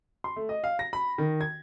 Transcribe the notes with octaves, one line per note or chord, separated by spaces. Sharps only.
C6
A3
D#5
F5
A#6
B5
D#3
G#6